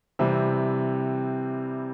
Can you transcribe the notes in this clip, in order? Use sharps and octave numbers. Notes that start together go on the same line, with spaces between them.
C3 E3 G3 C4